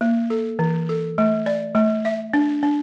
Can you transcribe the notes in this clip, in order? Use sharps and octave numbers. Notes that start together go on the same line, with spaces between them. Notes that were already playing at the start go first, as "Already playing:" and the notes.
A#3
A4
E3
A4
A3
D5
A3
E5
D4
D4